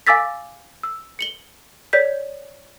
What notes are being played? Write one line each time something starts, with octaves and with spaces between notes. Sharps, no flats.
F5 G#5 D6 E6 A6 B6
E6
C#7 F#7 G7
C#5 D5 G6 B6